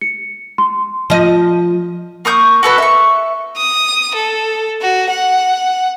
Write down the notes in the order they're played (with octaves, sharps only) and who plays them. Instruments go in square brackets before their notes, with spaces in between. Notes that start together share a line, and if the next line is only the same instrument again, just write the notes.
[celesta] C#7
C6
[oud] F3 D#5
[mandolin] A#3 C#6 D#6 G6
F#4 A4 B4 A5
E5 C#6
[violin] D#6
A4
F#4
F#5